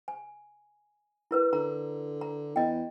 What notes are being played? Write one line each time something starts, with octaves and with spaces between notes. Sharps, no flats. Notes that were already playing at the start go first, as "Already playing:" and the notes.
G#5
E4 A#4 B4
D3 A#5
A#5
E2 D#5 G5